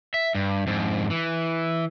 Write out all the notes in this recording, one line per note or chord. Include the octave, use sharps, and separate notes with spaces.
E5
G2
F2 G#2
E3